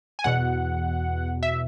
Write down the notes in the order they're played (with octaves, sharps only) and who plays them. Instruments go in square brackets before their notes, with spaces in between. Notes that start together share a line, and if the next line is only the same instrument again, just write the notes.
[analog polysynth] G#5
E2 B2 F#5
E5